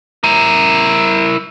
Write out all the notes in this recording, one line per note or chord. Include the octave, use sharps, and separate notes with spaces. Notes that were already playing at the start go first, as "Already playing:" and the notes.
E4 A#4